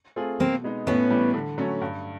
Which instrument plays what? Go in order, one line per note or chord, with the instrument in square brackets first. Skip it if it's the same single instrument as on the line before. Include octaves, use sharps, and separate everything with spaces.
[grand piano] A3 C4 F4 G#4
[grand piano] B2 [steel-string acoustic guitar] A#3 C4
[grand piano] G#3 B3 D#4
[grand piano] A2 [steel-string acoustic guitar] B3 C#4
[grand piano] E3 G3
D3
F#3 A3 C#4
G2